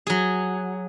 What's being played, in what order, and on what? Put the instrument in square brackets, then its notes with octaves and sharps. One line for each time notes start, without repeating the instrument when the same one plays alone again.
[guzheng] F#3 G#4